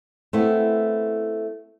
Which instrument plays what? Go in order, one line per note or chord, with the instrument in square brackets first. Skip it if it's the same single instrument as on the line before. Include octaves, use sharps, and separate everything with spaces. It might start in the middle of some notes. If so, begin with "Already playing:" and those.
[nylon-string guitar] A3 B3 C4 E4